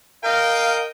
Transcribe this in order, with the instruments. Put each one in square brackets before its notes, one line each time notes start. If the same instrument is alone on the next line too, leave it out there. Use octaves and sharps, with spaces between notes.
[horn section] A#4 D#5 G5 [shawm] F5